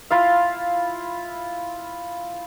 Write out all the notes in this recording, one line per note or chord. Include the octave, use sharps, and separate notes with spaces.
E4 F4 F5